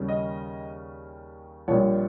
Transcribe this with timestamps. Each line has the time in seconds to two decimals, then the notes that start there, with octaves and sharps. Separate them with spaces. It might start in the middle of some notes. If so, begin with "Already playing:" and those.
Already playing: D#2 C#3 G3 C#4
0.08 D#5
1.68 A#1 A#2 G3 C#5